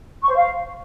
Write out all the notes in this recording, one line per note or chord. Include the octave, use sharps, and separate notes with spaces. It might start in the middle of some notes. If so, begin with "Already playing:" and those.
C#6
C5
F5